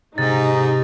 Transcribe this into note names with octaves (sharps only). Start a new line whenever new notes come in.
G#2 C3 D#4 A6